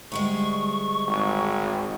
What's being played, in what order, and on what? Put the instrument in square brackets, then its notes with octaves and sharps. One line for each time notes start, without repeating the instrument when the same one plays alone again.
[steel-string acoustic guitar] D2 G3 G#3 [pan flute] C#6
[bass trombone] G#1